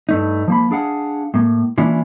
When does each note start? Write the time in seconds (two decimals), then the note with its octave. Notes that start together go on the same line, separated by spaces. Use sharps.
0.09 G2 A3 D#4
0.48 F3 A#3 B5
0.71 D4 G#4 F5 F#5
1.34 A2 A#3
1.78 E3 A#3 C#4 D4 E4 F4